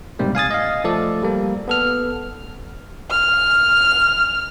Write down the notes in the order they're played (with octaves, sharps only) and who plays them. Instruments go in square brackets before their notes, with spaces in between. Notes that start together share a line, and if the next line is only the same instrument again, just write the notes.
[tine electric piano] B1 G#2 C3 G3 A#3
F5 G#5 D#6 A6
D#5 F5
F3 A3 A4 D5
G3 A#3
B3 A4 F6
[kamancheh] F6